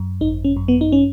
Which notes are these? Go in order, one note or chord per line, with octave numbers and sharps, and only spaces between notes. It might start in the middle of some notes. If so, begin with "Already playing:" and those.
Already playing: F#2
G#1 D#4
C#4
F#2
B3
D#4
C#4